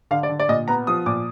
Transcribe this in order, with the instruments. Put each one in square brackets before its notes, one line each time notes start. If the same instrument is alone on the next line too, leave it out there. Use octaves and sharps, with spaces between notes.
[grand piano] D3 F5
D5
D3
D5
A#2 D#5
B3 A#5
F3 D#6
A#2 D6